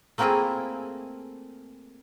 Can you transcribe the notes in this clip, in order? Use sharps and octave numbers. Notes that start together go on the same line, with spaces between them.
A3 A#3 C4 E4 F4 G#4